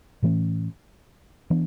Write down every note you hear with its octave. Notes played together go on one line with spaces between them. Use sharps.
A2 E3 A3 C#4
E3 B3 D4